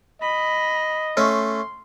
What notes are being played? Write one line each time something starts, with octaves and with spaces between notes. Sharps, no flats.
D#5 B5
A3 C#4 C6